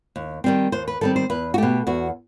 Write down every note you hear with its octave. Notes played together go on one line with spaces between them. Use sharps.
D#2
D#3 G3 C4
D#2 C5
B4
D#3 G3 C4 A4
C5
E2 B4
F#4
B2 A3 G4
E2 F#4